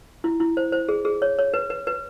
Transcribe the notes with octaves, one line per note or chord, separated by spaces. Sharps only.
E4
E4
C5
C5
G#4
G#4
C#5
C#5
B4
B4
B4